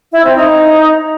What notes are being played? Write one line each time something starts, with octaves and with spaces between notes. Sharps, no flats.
E4
C4
D#4